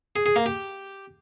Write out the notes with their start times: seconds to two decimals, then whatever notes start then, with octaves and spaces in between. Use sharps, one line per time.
0.16 G#4
0.26 G#4
0.36 A#3
0.46 G4